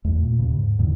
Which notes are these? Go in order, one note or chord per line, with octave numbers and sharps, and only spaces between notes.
E2 A3
A#2
D#2 C#3
G#2
E2 A2 D3 D#3